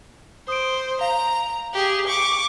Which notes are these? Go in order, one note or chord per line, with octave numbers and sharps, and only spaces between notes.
C5 D#6 D7
F5 A#5
G4 G#4
C#6 D6